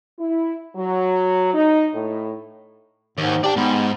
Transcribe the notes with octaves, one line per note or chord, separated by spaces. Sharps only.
E4
F#3
D#4
A2
D#2 G#2
G4 D5 A5
G#2 B3